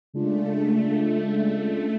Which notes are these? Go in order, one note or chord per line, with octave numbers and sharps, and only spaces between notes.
C#3 G#3 A3 D4 F4